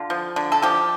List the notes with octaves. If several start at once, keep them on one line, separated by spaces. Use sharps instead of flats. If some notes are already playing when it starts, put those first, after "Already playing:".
Already playing: D3 F4
F3
D3
A4
F3 G4